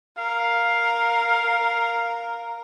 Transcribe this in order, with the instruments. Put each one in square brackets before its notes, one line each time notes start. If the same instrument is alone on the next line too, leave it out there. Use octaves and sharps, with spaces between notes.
[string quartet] A#4 [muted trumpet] F5